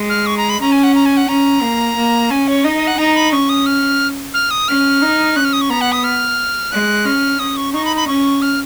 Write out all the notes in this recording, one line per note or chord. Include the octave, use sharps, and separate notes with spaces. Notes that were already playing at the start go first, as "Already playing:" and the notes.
Already playing: G#3
F6
C#6
A#5
B5
C#4 A#5
G#5
F#5
A#5
G#5
F#5
C#4 A#5
A#3
A#3
C#4 G#5
C#5
D#4 D#5
D#5
F#5
D#4 A#5
B5
C#4 C#6
D#6
F6
F6
D#6
C#4 F6
D#4
C#4 F#6
F6
D#6
C#6
B3 A#5
F#5
D#6
F6
G#3 F#6
C#4 F6
C#4 D#6
C#6
D#4 C#6
B5
B5
C#4 C#6
F6